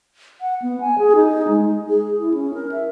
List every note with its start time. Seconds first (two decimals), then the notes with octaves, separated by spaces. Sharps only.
0.41 F#5
0.62 B3
0.81 G#5
0.98 G#4
1.15 D#4
1.48 G#3
1.89 G#4
2.19 E4
2.34 C#4
2.54 A#4
2.72 E5